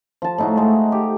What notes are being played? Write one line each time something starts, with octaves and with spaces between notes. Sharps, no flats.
F3 A5
A2 D#4 F#4
G#3 A3
G4